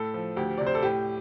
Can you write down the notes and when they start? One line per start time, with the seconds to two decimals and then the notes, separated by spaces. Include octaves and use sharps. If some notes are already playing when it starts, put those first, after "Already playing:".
Already playing: A2 A4
0.14 F3
0.37 D2 G4
0.58 C3 D5
0.67 C5
0.75 A4
0.83 A2 G4